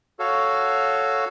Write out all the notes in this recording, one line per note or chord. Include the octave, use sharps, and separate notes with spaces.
F#4 A4 C#5 F5